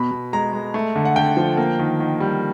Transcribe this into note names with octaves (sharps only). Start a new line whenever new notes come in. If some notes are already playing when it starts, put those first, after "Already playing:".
Already playing: B2 B5
B2
G#3 A#5
G#3
A3
D3
F#5
D3 G5
F3
A#3
D#3
D#3
G3